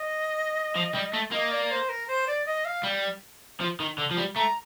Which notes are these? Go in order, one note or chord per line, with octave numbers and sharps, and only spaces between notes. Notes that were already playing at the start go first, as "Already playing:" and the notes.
Already playing: D#5
F3
G3
A3
A#3 D#5
D5
C5
A#4
C5
D5
D#5
F5
G3
F3
D#3
D3
F3
G3
A3 A#5